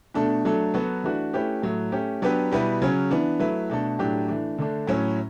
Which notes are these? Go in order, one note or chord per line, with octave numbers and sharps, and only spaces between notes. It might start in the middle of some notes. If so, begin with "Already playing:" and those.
B2 A3 D4 A4
F#3 A3 D4 A4
F#3 B3 F#4 A4
E3 A3 D4 F#4 B4
A3 C#4 E4 G4 B4
A2 F#3 A3
A3 C#4 G4
F#3 B3 D4 G4 B4
B2 G3 B3 E4 B4
C#3 F#3 C#4
E3 B3 D4
F#3 A3 E4 B4
B2 A3 D4 A4
A2 F#3 A3 D4 G4
E3 A3 D4
D3 A3 D4
A2 F#3 C#4 E4